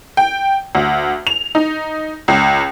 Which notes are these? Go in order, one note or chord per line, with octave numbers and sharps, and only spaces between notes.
G5
D2
F7
D#4
C#2